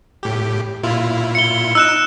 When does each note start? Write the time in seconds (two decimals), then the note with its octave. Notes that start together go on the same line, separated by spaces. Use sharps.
0.23 A2 G4
0.83 A#2 E4 F4
1.35 C#7 G7
1.75 D#4 E6 F#6 E7